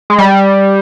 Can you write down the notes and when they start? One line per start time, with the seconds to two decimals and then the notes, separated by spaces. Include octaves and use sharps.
0.10 G#3
0.19 G3